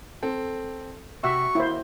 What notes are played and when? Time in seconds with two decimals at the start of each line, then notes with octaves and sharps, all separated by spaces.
0.23 C4 A4
1.24 C3 F#4 E5 C#6
1.55 D#2 A#3 E4 C5